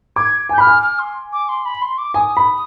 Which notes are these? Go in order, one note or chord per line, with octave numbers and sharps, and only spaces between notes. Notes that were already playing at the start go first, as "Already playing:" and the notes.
D6 G#6
G#5
G6
B5 F6
G#5
F6
C6
D6
C6
B5
C6
D6
G#5 D#6
B5